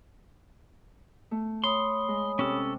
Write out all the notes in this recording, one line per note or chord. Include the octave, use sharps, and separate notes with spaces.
A3
C#5 B5 C6 D#6
G#3
C3 C#4 A4